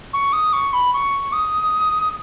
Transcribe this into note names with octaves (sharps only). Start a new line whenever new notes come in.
C#6
D#6
C#6
B5
C#6
D#6